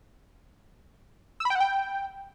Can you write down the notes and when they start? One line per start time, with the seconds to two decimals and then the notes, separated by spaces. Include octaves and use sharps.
1.40 E6
1.45 B5
1.50 G5
1.55 F#5
1.60 G5